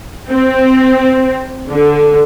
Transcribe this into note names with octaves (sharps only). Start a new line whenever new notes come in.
C4
D3